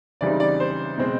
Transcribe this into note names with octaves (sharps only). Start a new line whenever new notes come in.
C#3 E3 G3 C4 D#4 D5
D5
C5
B2 G#3 C4